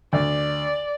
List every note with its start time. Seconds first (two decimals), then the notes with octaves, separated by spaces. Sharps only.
0.13 D2 D5